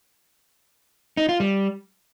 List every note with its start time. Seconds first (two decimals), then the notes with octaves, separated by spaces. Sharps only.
1.17 D#4
1.29 F4
1.40 G3